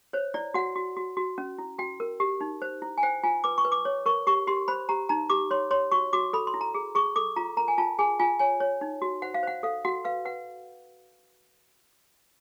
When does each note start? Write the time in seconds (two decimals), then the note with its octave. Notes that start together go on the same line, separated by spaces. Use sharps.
0.13 C5 C#5
0.34 E4 D5
0.54 F#4 F#5
0.76 F#4
0.97 F#4
1.17 F#4
1.38 C#4
1.58 E4
1.79 F#4 G5
2.00 A#4
2.20 G4
2.41 D#4
2.62 C5
2.82 E4
2.98 G#5
3.03 C5 G5
3.23 F4 G#5
3.44 B4 D6
3.58 C#6
3.65 B4
3.72 D6
3.85 C#5
4.06 A#4 C#6
4.27 G4 C#6
4.47 G4 C6
4.68 C5 B5
4.89 G4 A#5
5.09 D#4 A#5
5.30 G4 D6
5.51 C#5 C6
5.71 C#5 C6
5.92 F#4 C#6
6.13 F#4 D6
6.33 A4 B5
6.47 C6
6.54 E4
6.61 A#5
6.74 G#4
6.95 G#4 C#6
7.16 A4 D6
7.36 F4 A#5
7.57 A#4 A#5
7.68 G#5
7.78 F4 A5
7.99 G#4 G#5
8.19 F4 G#5
8.39 C#5 G#5
8.60 C#5
8.81 D#4
9.02 F#4
9.22 C5 F#5
9.34 F5
9.43 C5 F#5
9.63 A4 F5
9.85 F#4 F#5
10.05 B4 F5
10.25 B4 F#5